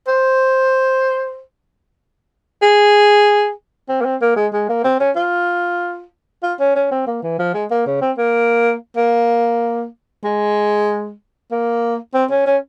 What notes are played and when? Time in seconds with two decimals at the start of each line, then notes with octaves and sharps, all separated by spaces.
0.07 C5
2.62 G#4
3.89 C4
4.01 A#3
4.05 C4
4.21 A#3
4.36 G#3
4.53 G#3
4.69 A#3
4.84 C4
4.99 C#4
5.16 F4
6.43 F4
6.59 C#4
6.75 C#4
6.91 C4
7.07 A#3
7.23 E3
7.39 F3
7.54 G#3
7.70 A#3
7.86 C#3
8.01 C4
8.18 A#3
8.96 A#3
10.24 G#3
11.51 A#3
12.14 C4
12.31 C#4
12.46 C#4